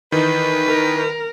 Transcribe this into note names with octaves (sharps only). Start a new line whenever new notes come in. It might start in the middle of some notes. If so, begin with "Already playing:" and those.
D#3 E3 D#4 B4
A#4